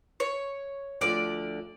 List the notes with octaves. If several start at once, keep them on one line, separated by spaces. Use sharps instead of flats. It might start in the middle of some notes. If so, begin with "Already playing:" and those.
C#5
D2 D3 F3 D5